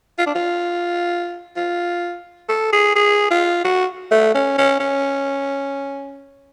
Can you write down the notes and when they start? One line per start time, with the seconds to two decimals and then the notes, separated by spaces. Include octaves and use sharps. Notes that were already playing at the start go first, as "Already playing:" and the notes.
0.18 F4
0.26 D4
0.35 F4
1.56 F4
2.49 A4
2.72 G#4
2.95 G#4
3.30 F4
3.64 F#4
4.11 A3
4.34 C#4
4.58 C#4
4.80 C#4